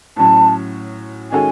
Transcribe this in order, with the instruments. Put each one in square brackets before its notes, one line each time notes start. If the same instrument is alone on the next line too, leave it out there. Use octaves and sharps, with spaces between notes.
[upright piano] A2 F#3 C#4 [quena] A5
[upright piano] D#3 G#3 C#4 F#4 A4 [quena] G#5